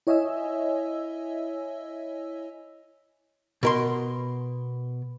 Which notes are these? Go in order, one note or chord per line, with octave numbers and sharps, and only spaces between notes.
E4 C#5 D#5 E5 G#5 E6
B2 A#4 C6